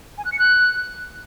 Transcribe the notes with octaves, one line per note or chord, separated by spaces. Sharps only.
G#5
F#6
C#7
F#6